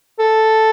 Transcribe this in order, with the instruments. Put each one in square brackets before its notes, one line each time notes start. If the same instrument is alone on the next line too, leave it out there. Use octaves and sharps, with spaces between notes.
[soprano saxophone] A4